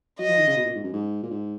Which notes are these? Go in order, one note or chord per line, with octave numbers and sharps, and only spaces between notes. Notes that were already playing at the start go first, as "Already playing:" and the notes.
F#3 D#5
F3
D#3
C#3
B2
A#2
G#2
F#2
G#2
A#2
G#2